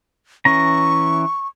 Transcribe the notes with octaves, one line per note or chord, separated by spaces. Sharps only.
E3 C#4 A#5 C#6